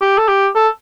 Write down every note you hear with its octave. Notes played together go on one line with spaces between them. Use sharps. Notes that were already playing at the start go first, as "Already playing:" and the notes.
G4
A4
G4
A4